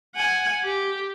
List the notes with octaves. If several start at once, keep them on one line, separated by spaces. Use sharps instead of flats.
F#5 G#5
G4